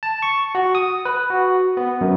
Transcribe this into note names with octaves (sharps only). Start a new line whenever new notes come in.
A5
C#6
F#4
D#6
B4
F#4
B3
F#2